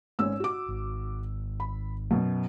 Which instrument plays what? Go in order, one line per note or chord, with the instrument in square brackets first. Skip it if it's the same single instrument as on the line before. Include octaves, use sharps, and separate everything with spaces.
[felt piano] G#1 C#4 E6
F#4 D6
[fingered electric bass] G#1
[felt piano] B5
F#2 B2